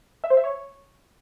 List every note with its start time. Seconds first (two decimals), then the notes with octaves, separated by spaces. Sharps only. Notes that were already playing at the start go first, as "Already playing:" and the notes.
0.24 E5
0.30 C5
0.37 E5
0.44 C#5